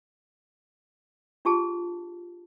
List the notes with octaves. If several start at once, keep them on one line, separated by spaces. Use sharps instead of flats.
D4 F4 G4 G#4 A5